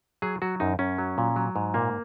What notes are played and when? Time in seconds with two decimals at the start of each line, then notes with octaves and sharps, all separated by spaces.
0.22 F#3 G#4
0.42 F#3 F#4
0.60 F#2 D#4
0.79 F#2 C#4
0.98 F#3
1.18 A#2
1.36 F#3
1.56 G#2
1.74 A#2 A#3